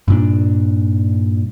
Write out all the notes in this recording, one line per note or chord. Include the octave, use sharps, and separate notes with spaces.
G2 A#2 D4